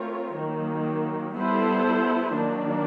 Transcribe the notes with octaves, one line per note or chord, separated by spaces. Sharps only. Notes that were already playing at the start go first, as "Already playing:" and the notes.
Already playing: A3 C4 F4 A#4 C#5
D#3 F#3 A#3
G3 B3 E4 A4 C5
D#3 F#3 A#3 D4